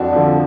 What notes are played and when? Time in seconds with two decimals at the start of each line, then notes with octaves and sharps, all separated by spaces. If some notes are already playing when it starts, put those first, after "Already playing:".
Already playing: F2 D4 F#4
0.13 D3 F3